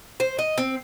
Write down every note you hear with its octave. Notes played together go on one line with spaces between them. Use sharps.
C5
D#5
C4